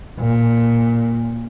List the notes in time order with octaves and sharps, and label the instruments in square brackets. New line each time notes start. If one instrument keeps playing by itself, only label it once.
[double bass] A#2